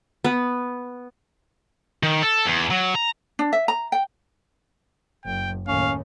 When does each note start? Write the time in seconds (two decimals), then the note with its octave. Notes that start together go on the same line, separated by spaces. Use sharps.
0.24 B3
2.03 D#3
2.23 A4
2.46 E2
2.71 F#3
2.95 A#5
3.39 D4
3.53 E5
3.68 A#5
3.92 G5
5.25 F#1 G5
5.68 D#2 A2 C#4 F5